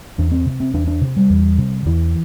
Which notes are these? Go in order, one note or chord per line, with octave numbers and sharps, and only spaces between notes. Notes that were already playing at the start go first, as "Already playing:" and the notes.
E2 D4
C4
C3
C4
E2 D4
D4
C3
G3
E2
C3
E2 E3